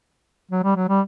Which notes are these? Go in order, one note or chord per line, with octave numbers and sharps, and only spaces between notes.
F#3
G3
F#3
G3